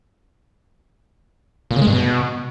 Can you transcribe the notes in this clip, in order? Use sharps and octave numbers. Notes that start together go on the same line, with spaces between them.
A#2
C#3
G#3
G2
B2